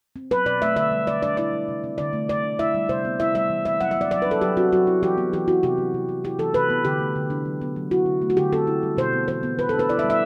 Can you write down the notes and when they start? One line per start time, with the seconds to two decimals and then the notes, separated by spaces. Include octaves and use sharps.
0.16 C4
0.31 F#3 B4
0.46 B2 D5
0.62 A3 E5
0.76 D3 E5
0.91 G3
1.07 D3 D5
1.23 D4 D5
1.37 E4 D5
1.53 G3
1.68 C3
1.84 C4
1.98 D3 D5
2.13 A3
2.29 D3 D5
2.44 D4
2.59 E4 E5
2.74 G3
2.89 C3 C5
3.05 B3
3.19 E4 E5
3.35 G3 E5
3.50 E3
3.65 C4 E5
3.81 F#3 F#5
3.91 E5
3.97 B3 D5
4.11 F#3 D5
4.22 B4
4.26 D4
4.31 A4
4.41 F#3 G4
4.57 C4 F#4
4.72 F#3 F#4
4.87 E4
5.02 E3 G4
5.18 B3
5.33 E3 G4
5.48 E4 F#4
5.63 C3 G4
5.78 F#3
5.94 C3
6.09 C4
6.24 E4 G4
6.39 E3 A4
6.54 C3 B4
6.70 B3
6.85 D3 G4
7.00 A3
7.16 D3
7.30 D4
7.45 F#3
7.61 B3
7.76 F#3
7.91 E4 F#4
8.06 D3
8.22 A3
8.30 F#4
8.37 D3 G4
8.53 C4 A4
8.67 E4
8.83 G3
8.97 B2 C5
9.13 B3
9.28 E3 C5
9.43 B3
9.59 E3 B4
9.69 A4
9.74 D4
9.79 B4
9.89 E4 D5
9.99 E5
10.04 G3
10.10 E5